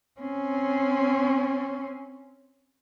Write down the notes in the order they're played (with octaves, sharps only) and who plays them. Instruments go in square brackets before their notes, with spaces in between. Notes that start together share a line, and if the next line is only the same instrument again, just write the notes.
[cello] C4 C#4